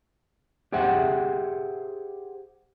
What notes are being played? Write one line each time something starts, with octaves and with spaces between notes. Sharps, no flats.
G4 G#4 C5 E5 F#5